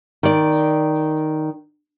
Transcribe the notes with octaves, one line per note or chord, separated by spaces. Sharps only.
D#3 D5